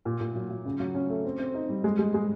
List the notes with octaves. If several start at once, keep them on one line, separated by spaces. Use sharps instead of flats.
A#2
A#2
F#3
F#3
C#3
F#3
C#4
A3
C4
C4
D#4
G3
G#3
G#3
G#3